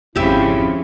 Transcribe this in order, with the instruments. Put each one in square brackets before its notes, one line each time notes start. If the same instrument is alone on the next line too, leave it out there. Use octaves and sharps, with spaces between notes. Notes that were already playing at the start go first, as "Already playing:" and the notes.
[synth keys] G#1 F2 C4 [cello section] C#3 F3 [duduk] E4 [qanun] G4 E5